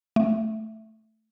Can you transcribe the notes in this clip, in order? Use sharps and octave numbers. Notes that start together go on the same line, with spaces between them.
A3